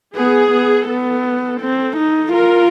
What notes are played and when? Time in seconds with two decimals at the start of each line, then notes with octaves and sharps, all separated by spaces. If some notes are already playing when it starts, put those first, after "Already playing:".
0.16 B3 G#4
0.52 B3
0.88 B3 A4
1.61 C4
1.97 D#4
2.33 F4 A#4